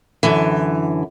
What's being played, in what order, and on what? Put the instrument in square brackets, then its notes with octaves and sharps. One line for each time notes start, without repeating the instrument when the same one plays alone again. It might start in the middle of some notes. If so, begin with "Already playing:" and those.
[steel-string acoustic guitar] F#2 D3 E3